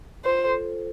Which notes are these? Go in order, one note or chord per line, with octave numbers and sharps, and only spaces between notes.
F4 C5
A4
C5